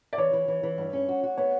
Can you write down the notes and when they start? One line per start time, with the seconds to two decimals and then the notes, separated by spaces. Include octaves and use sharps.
0.13 D5
0.18 E3 C#5
0.33 E3
0.48 E3
0.63 E3
0.78 G2
0.93 C#4
1.08 F#4
1.23 F#4
1.37 B3 C#5